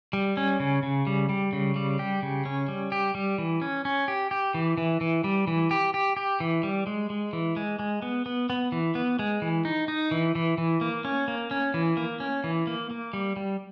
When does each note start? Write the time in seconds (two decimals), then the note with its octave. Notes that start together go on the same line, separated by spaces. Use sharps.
0.13 G3
0.37 C#4
0.60 C#3
0.83 C#3
1.07 G3
1.29 G3
1.53 C#3
1.76 G3
1.99 G4
2.22 C#3
2.45 C#4
2.68 G3
2.92 G4
3.15 G3
3.38 E3
3.62 C#4
3.85 C#4
4.08 G4
4.31 G4
4.54 E3
4.78 E3
5.01 E3
5.24 G3
5.47 E3
5.71 G4
5.94 G4
6.17 G4
6.40 E3
6.63 G3
6.87 G#3
7.10 G#3
7.33 E3
7.57 G#3
7.79 G#3
8.02 B3
8.26 B3
8.50 B3
8.72 E3
8.95 B3
9.19 G#3
9.42 E3
9.65 D#4
9.88 D#4
10.11 E3
10.35 E3
10.58 E3
10.81 A#3
11.05 C#4
11.28 A#3
11.51 C#4
11.74 E3
11.97 A#3
12.20 C#4
12.44 E3
12.67 A#3
12.90 A#3
13.13 G3
13.36 G3